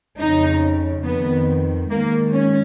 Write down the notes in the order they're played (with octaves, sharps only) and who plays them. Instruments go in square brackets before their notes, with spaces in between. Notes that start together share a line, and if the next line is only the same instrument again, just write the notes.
[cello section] F2 C#3 D#4
F2 D#3 B3
G#2 D#3 A#3
C#4